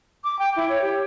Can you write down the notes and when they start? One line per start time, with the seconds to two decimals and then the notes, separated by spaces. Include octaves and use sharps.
0.24 D6
0.39 G5
0.56 E4
0.69 C#5
0.82 G4